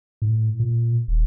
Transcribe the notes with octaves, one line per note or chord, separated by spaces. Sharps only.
A2
A#2
D#1